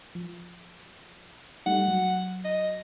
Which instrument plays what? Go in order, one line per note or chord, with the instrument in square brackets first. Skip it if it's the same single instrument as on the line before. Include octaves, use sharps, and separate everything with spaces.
[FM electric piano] F3
[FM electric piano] G3 A3 D#4 [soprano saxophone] F#5
[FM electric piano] F#3
[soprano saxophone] D#5